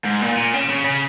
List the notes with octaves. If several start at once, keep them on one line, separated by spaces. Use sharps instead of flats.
G#2
A#2
A#2
C#3
C#3
C#3